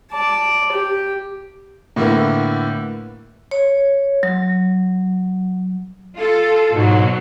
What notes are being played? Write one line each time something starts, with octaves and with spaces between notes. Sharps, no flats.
D5 A5
G4
A2 D3 A#3 B3 E4
C#5
F#3
F4 A4
G#2 B2 F#3